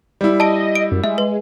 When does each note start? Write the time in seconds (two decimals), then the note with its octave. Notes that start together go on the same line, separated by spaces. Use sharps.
0.21 G3 E4
0.40 D#5 A5 D7
0.75 D7
0.91 F#2
1.04 G#3 E5
1.18 B4